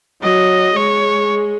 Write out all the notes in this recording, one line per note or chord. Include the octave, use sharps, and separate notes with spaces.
F#3 D#5
G#3 C#5